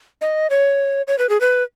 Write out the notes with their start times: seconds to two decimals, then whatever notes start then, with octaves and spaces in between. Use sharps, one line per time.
0.21 D#5
0.50 C#5
1.07 C#5
1.19 B4
1.29 G#4
1.41 B4